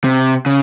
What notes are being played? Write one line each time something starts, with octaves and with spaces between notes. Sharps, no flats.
C3
C#3